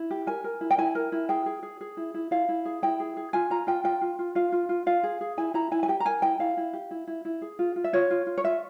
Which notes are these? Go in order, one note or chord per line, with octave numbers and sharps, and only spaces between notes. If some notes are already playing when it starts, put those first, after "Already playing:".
Already playing: E4
G4
A#4 G#5
A#4
E4
G5
E4 G#5
A#4
E4
G#4 G5
G#4
G#4
G#4
E4
E4
E4 F5
E4
G#4
E4 G5
G#4
G#4
F4 G#5
F4 A#5
F4 G5
F4 G5
F4
F4
F4 F5
F4
F4
F4 F5
G#4
G#4
E4 G#5
E4 A#5
E4 G#5
G#5
G4 G5
A#5
A#4 G#5
E4 G5
E4 F5
E4
G4
E4
E4
E4
G#4
F4
F4
E5
F4 C#5
F4
F4
C#5
F4 E5